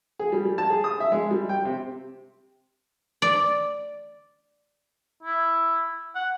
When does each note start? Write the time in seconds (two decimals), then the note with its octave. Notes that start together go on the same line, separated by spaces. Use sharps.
0.19 G#4
0.32 G3
0.45 G3
0.58 A5
0.70 G#4
0.84 D#6
1.00 E5
1.12 G#3
1.31 G3
1.49 G5
1.65 C3
3.22 D5
5.23 E4
6.15 F#5